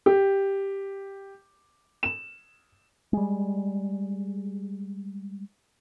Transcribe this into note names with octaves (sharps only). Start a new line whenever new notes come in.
G4
E7
G3 G#3